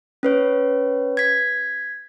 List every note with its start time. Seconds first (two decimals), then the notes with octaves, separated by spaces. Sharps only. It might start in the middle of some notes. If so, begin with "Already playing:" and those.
0.23 C#4 B4 C#5
1.17 G#6 B6